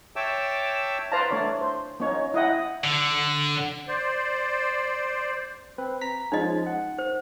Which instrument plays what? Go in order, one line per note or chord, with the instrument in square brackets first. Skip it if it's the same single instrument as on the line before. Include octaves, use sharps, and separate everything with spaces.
[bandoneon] C#5 E5 G5 A5 D6 E6
[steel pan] B4 C5 D5 F5 A5 A#5
A3 D4 C#5 D5
C5
A#3 C#4 D#4 C#5
E4 D#5 F#5 G5
[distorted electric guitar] D3
[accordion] C5 D5
[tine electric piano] C4 B4
A#5 B6
[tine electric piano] F3 G#3 C#4 [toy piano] D#4 D#5
[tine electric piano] F#5
[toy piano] C5